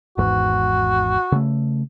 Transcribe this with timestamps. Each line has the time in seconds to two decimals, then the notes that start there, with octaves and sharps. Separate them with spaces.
0.18 G#1 E2 G#2 F#4
1.32 C#3 A3